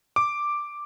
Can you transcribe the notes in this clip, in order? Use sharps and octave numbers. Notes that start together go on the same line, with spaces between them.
D6